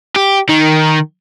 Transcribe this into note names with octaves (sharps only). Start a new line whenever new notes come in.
G4
D#3